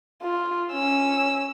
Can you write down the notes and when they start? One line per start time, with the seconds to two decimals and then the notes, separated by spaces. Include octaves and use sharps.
0.23 F4
0.73 C#4 E6